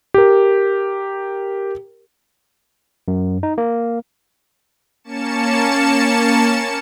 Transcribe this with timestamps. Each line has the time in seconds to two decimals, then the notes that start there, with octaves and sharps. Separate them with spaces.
0.14 G4 A#4
3.08 F#2
3.43 D#4
3.58 A#3
5.04 A#3 C#4 A5 C#7 E7